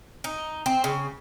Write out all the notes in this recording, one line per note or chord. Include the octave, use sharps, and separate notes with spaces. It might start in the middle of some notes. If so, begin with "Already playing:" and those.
D#4
C4
C#3